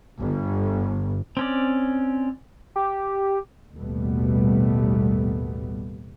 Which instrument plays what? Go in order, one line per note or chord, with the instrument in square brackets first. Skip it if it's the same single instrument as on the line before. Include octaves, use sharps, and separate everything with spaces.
[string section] G1
[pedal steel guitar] C4 C#4 D5
[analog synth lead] G4
[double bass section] A1 D#2 B2 G3 A3 B3